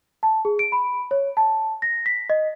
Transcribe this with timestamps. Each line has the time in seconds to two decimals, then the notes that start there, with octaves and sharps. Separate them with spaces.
0.23 A5
0.45 G#4
0.59 D7
0.72 B5
1.11 C#5
1.37 A5
1.82 A#6
2.06 B6
2.30 D#5